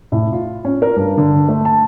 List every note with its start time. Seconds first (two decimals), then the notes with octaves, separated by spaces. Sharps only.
0.12 A2
0.33 F4
0.65 C#4
0.82 A#4
0.96 G2
1.17 D3
1.49 A3
1.65 A5